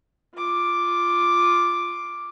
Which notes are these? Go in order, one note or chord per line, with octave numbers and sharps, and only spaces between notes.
F4 D6